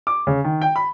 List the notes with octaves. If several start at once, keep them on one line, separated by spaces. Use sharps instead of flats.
D6
C#3
D#3
G5
B5